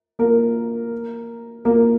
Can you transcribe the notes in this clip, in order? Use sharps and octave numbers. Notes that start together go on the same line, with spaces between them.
A#3 A#4
A#3 A#4